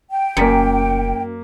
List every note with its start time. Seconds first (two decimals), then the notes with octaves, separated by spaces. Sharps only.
0.11 G5
0.37 F1 F#2 A#3 B6 C#7